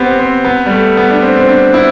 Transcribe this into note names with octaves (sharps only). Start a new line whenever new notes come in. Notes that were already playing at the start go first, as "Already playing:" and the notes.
Already playing: B3 C4 G4
C4
B3
G3
A3
B3
D4
C4
C4
D4
E4